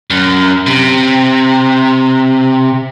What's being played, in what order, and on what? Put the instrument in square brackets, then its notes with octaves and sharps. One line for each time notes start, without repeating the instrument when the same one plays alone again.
[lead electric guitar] F#2
C3